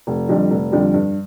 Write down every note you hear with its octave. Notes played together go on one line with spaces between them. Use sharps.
F1
F2 D3 G3
F1
F2 D3 G3
G2